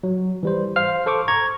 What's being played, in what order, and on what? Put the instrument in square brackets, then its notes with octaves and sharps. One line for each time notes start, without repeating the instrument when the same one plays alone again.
[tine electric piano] F#3
E3 G3 C5
C5 F5 F6
A4 C5 C#6 D6
A#5 C#6 G#6